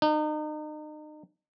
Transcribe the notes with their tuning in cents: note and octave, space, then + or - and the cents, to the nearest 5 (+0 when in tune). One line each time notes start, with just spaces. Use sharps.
D#4 -35